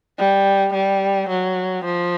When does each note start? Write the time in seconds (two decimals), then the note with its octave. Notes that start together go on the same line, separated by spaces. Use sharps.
0.19 G3
0.74 G3
1.29 F#3
1.85 F3